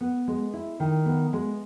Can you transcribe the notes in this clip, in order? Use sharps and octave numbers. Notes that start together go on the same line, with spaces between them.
B3
G#3
E4
D#3
B3
G#3